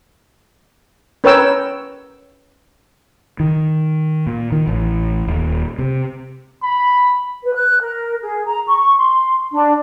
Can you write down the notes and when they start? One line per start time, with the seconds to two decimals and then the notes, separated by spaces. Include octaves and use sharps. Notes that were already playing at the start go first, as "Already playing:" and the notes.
1.24 C#4 A#4 B4 C#5 G5 E6
3.40 D#3
4.27 A#2
4.52 D#3
4.67 A1
5.28 D#1
5.79 C3
6.62 B5
7.43 B4
7.55 F#6
7.81 A#4
8.22 G#4
8.46 A#5
8.67 C#6
8.97 C6
9.52 D4